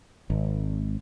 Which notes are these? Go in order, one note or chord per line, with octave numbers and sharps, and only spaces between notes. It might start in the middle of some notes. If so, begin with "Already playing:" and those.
G#1